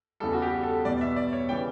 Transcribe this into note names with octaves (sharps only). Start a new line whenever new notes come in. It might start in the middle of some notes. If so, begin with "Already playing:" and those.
E2 C#3 E3 G3 A4
F#4
G4
A4
E2 B2 G3 D5
E5
D5
C#5
C#3 E3 G3 G5